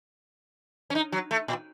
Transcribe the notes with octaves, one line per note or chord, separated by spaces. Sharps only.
C#4
D#4
F#3
A3
A#2